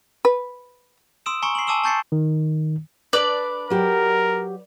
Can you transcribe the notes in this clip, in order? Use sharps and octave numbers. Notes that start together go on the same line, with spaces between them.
B4
C6 D#6 E6 D7 E7
G#5 A#5 C6 C#6 C#7 D7
C7 D7 F#7
G#5 A5 D6 E6 E7 G7
A5 C#6 G6 A6 C7 C#7
D#3
D4 A4 B4 D5
F#3 G4 A#4 F#5